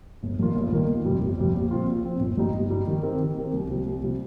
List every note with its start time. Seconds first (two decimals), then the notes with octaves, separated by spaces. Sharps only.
0.23 G1
0.39 G2 D#3 A#3 F4
0.56 G1
0.72 G2 D#3 A#3 F4
0.89 G1
1.05 F2 C3 G3
1.21 G1
1.38 F2 C3 G3
1.54 A#1
1.71 A#2 F3 C4 F4
1.88 A#1
2.04 A#2 F3 C4 F4
2.20 G1
2.37 G2 G3 D#4 G4
2.54 G1
2.70 G2 G3 D#4 G4
2.87 D#3
3.03 C4 G4 A#4
3.19 D#3
3.37 C4 G4 A#4
3.53 C2
3.69 C3 G3
3.86 C2
4.02 C3 G3